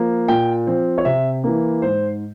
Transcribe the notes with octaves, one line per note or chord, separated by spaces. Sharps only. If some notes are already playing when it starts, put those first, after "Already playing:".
Already playing: F3 A#3
A#2 G5
F3 C4
C#5
C3 E5
E3 A#3
G#2 C5